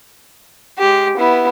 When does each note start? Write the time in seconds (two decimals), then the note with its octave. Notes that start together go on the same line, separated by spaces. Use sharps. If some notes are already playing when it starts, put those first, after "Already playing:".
0.79 G#3 G4
1.17 B3 E4